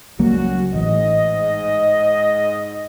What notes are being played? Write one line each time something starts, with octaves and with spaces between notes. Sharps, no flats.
C#2 F#3 G3 A#3 C#4 F#4
A1 G#2 D#5